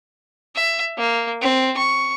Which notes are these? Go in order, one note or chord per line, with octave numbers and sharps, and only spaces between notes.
E5
A#3
C4
C#6